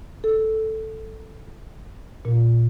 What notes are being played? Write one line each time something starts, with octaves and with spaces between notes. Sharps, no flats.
A4
A#2